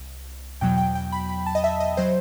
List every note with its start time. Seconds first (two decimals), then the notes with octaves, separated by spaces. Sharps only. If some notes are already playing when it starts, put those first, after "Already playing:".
Already playing: C2
0.61 E2 B2 F#3 G5
0.77 G5
0.95 G5
1.12 B5
1.29 B5
1.46 A5
1.55 D#5
1.64 E5
1.80 D#5
1.97 F#3 C5